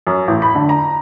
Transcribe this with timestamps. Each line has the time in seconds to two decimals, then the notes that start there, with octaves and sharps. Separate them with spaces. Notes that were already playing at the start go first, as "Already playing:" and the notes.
0.07 F#2
0.28 A1
0.42 B5
0.55 D3
0.69 A#5